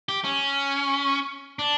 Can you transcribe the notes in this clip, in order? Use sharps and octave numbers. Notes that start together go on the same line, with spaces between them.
G4
C#4
D4